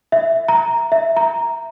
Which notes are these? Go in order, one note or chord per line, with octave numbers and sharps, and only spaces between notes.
E5
A#5
E5
A#5